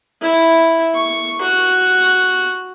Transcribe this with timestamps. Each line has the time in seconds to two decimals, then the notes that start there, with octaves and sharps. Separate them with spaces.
0.21 E4
0.95 C#6
1.42 F#4